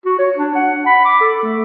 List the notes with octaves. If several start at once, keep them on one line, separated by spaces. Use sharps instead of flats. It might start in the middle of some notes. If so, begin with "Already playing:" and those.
F#4
C#5
D4
F#5
B5
D6
A4
A3